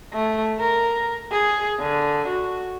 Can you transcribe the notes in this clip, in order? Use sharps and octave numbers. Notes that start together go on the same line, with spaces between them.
A3
A#4
G#4
D3
F#4